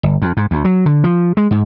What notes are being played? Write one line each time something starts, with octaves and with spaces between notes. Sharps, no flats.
G1
F2
G#2
D2
F#3
D3
F3
G#3
G#2